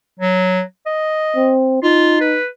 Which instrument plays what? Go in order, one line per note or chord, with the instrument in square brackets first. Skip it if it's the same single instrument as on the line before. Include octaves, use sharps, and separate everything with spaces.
[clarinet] F#3
D#5
[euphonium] C4
[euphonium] D#4 [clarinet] F4
[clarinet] B4